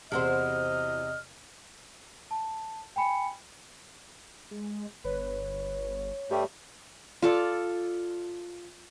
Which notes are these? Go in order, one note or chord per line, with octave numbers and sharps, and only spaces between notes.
E2 C3 E4 F#4 C5 D#5 F6
A5
G5 G#5 B5 C#7
G#3
G1 B4 C#5
G2 G3 A3 G4
F4 A4 D5